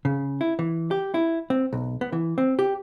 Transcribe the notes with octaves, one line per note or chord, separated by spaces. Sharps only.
C#3
E4
E3
G4
E4
C4
B1
B3
E3
C4
G4